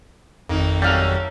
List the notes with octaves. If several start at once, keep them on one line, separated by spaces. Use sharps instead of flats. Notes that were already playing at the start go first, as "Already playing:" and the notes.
G#1 F2 A#3 D#4
F#3 G3 A3 A#3 C#4 G4 F5